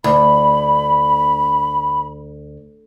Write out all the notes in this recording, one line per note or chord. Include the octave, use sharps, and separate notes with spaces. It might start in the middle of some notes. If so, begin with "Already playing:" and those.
D2 B5